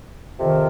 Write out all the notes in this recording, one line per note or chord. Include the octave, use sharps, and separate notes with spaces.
F2 C3 D#3